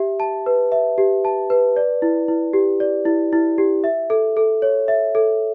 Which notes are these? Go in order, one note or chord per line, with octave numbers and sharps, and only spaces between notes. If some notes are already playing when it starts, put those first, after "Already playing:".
Already playing: G4 E5
A5
B4
E5
G4
A5
B4
D5
E4
E4
G4
D5
E4
E4
G4
E5
A4
A4
C#5
E5
A4